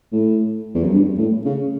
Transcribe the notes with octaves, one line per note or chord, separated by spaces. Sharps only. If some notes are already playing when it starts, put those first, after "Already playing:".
A2
E2
F#2
G2
A2
C#3